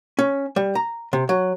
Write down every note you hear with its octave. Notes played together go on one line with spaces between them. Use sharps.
C#4
G3
A#5
C3
F#3